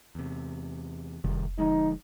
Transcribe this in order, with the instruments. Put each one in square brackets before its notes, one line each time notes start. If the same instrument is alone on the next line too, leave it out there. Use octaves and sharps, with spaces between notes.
[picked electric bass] E2 C3
[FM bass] F1 [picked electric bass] C3 D#3 G3
[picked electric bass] D3 F3 G#3 [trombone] D#4